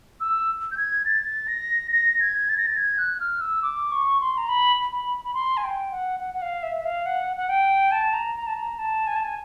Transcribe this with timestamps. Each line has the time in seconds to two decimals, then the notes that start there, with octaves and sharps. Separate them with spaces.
0.20 E6
0.72 G6
0.77 G#6
1.05 A6
1.48 A#6
1.92 A#6
2.21 G#6
2.49 A6
2.58 A#6
2.66 A6
2.77 G#6
2.98 F#6
3.20 F6
3.41 E6
3.63 D6
3.92 C#6
4.21 C6
4.38 A#5
4.49 B5
4.92 B5
5.25 B5
5.34 C6
5.57 G#5
5.64 G5
5.91 F#5
6.20 F#5
6.34 F#5
6.42 F5
6.63 E5
6.76 E5
6.85 F5
7.06 F#5
7.37 F#5
7.49 G5
7.92 A5
8.13 A#5
8.35 A#5
8.47 A5
8.57 A#5
8.78 A5
9.07 G#5
9.16 A5
9.24 G#5